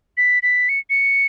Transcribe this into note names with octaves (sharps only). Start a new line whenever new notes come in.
B6
B6
C#7
C#7